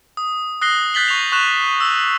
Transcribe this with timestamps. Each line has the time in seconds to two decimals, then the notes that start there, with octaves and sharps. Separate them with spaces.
0.17 D#6
0.62 D#6 F#6 A#6 C7 G7
0.94 F#6 G6 A6 B6 F#7 G7
1.08 C#6 F7
1.32 C#6 F#6 E7 F7
1.80 E6 F#7